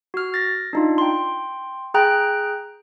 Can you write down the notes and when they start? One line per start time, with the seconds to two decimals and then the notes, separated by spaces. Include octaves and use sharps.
0.14 F#4 F6
0.34 A6 A#6
0.73 D4 D#4 F4
0.98 G5 C6
1.94 G#4 G5 A#5 F#6